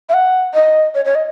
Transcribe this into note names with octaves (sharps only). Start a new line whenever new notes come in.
E5
F#5
D#5
C#5
C#5
D#5